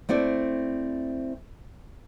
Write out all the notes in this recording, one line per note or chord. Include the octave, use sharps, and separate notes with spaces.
A3 C4 E4 D5